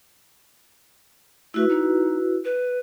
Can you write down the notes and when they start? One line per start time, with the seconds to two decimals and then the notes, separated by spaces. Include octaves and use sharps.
1.54 A3 E4 F#4 B4
1.69 D#4
2.45 B4